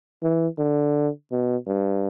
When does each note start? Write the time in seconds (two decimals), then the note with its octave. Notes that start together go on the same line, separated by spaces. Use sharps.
0.22 E3
0.58 D3
1.31 B2
1.67 G2